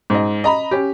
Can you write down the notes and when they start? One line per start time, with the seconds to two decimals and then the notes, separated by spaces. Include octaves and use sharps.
0.10 G#2 D#5
0.44 D#5 A#5 B5
0.71 C#4 G4